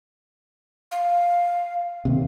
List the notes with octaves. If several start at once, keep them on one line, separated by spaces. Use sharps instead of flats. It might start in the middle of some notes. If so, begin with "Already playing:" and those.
F5
D#2 C3